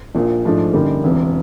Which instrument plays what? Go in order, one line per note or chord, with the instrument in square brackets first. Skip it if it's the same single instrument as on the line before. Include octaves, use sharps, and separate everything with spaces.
[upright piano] A#1 A#2 F3
G#2 F3 A3 D4
F#2 D3 G3 A#3 D#4
E1 E2 C3